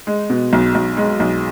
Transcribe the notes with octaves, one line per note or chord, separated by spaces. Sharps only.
G#3
B2
B1
B1
G#3
B1